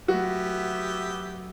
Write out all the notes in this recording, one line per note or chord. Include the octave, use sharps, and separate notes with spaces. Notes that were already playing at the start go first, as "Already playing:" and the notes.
F#3 A3 B3 F#4 G4 E5